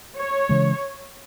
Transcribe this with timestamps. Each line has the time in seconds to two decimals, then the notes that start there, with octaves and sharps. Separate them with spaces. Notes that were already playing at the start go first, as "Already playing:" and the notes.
0.17 C#5
0.49 C#3 E3 G#3